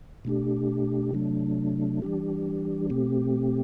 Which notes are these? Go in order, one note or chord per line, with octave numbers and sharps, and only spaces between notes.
B2 A3 D4 G4
C3 F#3 A3 D4
E3 G3 D4 G4
B2 A3 C4 G4